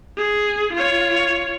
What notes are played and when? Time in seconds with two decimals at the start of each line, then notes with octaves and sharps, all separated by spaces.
0.17 G#4
0.73 F4 C#5